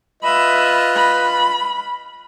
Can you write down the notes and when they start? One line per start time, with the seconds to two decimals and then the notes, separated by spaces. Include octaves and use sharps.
0.23 F4 B4 D#5 E5 B5
0.96 B5